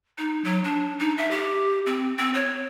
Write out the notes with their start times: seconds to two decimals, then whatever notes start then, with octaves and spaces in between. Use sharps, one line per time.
0.18 D#4
0.44 F#3
0.64 D4
0.99 D#4
1.18 E5
1.31 G4
1.86 C4
2.19 C4
2.34 C#5